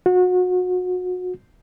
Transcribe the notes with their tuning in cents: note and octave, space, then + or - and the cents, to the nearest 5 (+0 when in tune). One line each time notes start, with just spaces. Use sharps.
F#4 -30